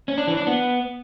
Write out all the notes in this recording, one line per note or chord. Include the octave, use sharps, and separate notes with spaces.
C#4
D4
E3
D4
B3